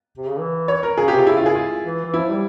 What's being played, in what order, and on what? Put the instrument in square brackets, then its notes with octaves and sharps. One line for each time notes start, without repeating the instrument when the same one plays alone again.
[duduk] C3
C#3
E3
[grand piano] C#5
A#4
[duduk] C#3 [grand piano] G#4
[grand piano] G4
[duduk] C3 [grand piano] F4
[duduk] C#3 [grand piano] E4
[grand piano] F4
G#4
F4
[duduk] E3
E3
[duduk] F3 [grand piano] E4
[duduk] G3